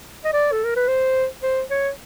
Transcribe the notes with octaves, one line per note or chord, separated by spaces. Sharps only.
D#5
D5
A4
A#4
B4
C5
C5
C#5